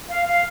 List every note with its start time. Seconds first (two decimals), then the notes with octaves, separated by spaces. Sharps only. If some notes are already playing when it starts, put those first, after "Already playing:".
0.09 F5
0.26 F5